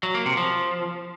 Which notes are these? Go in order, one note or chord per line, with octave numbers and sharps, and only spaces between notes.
F#3
A#3
C3
F3